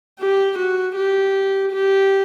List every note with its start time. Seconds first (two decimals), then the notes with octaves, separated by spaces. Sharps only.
0.20 G4
0.58 F#4
0.96 G4
1.72 G4